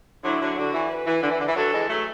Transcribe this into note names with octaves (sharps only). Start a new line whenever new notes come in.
D3 F#3 E4
D3 F#3
D3 F#4
E3
B4
E3
D3
E3
D3
E3
D3 F#3 A4
E3 G#3
F#3 A3